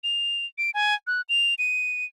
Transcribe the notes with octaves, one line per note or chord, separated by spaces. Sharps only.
F7
D7
G#5
F#6
F7
D#7